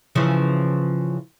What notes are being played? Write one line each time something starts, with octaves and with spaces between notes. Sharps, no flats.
C#3 E3 F3